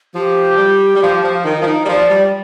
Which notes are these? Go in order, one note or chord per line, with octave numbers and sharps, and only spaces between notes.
F3 G4
G3
G3
F3
F3
D#3
F3
D#3
G3
F3 D5
G3